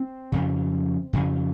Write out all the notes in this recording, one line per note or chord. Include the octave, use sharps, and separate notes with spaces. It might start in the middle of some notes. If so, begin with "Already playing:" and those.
Already playing: C4
F2 C#3
F2 C#3